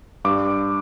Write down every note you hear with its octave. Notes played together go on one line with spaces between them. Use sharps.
G2 D6